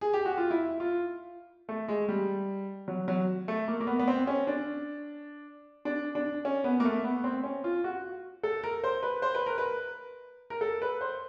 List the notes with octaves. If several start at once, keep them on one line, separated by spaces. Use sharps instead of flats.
G#4
G4
F#4
F4
E4
F4
A3
G#3
G3
F#3
F#3
A3
A#3
A#3
B3
B3
C4
C#4
D4
D4
D4
C#4
B3
A#3
A3
B3
C4
C#4
F4
F#4
A4
A#4
C5
B4
C5
B4
A#4
B4
A#4
A4
B4
C5